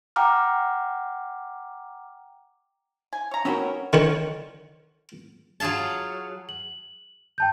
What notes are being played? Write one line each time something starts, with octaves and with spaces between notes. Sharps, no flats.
F#5 G5 A#5 D6 F6
G#5
C#5 A#5
D#3 F#3 B3 C#4 F#4 A#4
D3 D#3 C#5
F#3 F4 G#4 F5 A5
F#7
G5 A5 G6